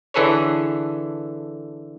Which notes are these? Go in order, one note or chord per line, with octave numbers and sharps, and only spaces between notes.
D3 E3 G#4 A4 B4 C#5